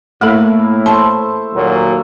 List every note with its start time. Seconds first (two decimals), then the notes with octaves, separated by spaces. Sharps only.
0.21 A2 A3 A#3 E4 A4 F5
0.86 A4 C5 A5 C#6
1.53 D#2 A#2 F#3